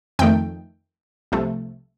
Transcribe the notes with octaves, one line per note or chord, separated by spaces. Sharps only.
F2 D#3 A3 G5
C2 C3 F3 A3